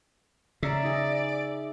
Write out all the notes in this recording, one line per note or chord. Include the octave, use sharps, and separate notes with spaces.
C#3 D5 E5 A#5
D#4 G#4